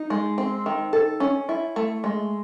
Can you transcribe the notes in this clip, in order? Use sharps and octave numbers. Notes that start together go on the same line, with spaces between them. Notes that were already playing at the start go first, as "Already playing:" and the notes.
Already playing: D#4
G#3
C4
D#3
A4
C#4
E4
A3
G#3